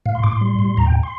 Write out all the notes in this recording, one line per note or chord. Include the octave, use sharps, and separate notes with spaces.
A2 F5
C6
A2 D6
C6
G3
A2
D#2 A#5
G5
C6